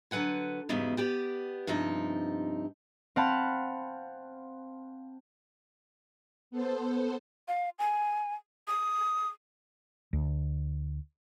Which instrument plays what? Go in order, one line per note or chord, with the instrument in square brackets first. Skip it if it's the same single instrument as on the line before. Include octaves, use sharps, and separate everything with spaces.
[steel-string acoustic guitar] D3 F#3 B4 F#5 G#5
E2 G#2 C#3 F#3 G3 B3
B3 G4 D5
G2 C3 F3 D#4
[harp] C4 F5 F#5 A5 B5
[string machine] B3 A4 C5
[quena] F5
G#5
D#6
[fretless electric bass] D2